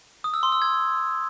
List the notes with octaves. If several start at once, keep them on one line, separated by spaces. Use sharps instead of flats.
D#6
E6
C6
E6
G#6